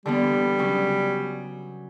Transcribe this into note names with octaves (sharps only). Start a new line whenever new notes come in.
D3 E3 G3 B3
C#3 F#3 C#4